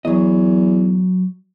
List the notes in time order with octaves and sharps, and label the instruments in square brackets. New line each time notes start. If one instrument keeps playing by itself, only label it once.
[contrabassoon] E2 [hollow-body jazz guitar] F#3 D#5